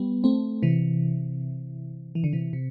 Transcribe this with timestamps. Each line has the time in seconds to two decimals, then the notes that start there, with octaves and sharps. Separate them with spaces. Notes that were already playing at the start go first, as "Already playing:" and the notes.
Already playing: G3 B3
0.24 A3 C4
0.63 C3 E3
2.15 E3
2.24 D3
2.33 C3 E3
2.53 C3